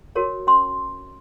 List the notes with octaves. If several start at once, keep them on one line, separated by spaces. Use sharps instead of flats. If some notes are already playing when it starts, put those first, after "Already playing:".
F#4 A#4 C#5
C#4 C6